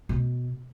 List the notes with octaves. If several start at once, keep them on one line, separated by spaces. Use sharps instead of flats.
B2